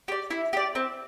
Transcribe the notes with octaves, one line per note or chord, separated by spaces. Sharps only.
G4 D5
E4
G4 D5
C4